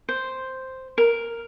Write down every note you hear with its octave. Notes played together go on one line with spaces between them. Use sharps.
C5
A#4